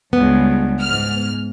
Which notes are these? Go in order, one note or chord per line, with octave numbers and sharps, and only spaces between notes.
C#2 G2 B3
G#2 F6